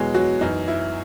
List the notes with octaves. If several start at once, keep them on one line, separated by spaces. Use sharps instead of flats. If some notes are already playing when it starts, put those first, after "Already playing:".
Already playing: E2 B2 F#3 G#3 G#4
F#3 F#4
F#2 E3 D#4
E4